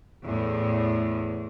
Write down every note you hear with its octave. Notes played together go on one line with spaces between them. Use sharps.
E2 A2